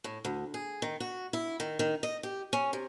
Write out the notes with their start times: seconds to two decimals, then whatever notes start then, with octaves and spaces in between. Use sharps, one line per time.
0.04 A2
0.25 D2
0.54 G#4
0.82 D#3
1.00 F#4
1.33 E4
1.60 D#3
1.79 D#3
2.03 D#5
2.23 G4
2.53 C#4
2.73 C3